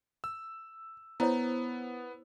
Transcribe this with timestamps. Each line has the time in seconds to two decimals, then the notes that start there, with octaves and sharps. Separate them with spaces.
0.24 E6
1.20 B3 E4 C5 C#5